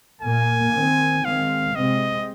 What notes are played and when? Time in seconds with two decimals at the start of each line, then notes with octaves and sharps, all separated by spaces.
0.21 A#2 A#3 G#5
0.73 D#3 C4
1.25 D#3 G#3 C4 F5
1.75 C3 G#3 C4 D#5